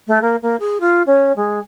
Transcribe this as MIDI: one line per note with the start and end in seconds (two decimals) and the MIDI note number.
0.07 0.19 57
0.21 0.36 58
0.42 0.56 58
0.59 0.77 68
0.80 1.02 65
1.06 1.32 61
1.36 1.59 56